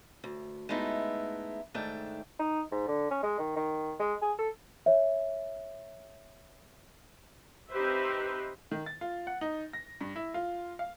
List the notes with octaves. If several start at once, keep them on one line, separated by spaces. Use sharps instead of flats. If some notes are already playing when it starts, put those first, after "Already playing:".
D2
G#3 A3 B3 D#4 E4
G#2 D#3 A3 D4 G5
D#4
G#2
D3
C#4
G#3
D#3
D#3
G#3
G#4
A4
C#5 E5
C4 D#4 G4 B4 C5 E5
D#3
A6
F4
F#5
D#4
A#6
G2
E4
F4
F5